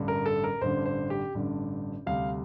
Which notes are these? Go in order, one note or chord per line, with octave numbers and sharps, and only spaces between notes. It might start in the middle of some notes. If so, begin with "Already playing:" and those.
Already playing: A1 G2 D3
A#4
A4
A#4
A1 G2 D3 C5
C5
G4
A1 G2 D3
D2 C3 G3 F5